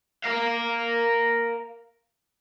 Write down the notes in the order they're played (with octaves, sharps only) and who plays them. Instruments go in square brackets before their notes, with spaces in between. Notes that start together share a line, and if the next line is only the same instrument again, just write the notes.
[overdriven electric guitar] A#4 F5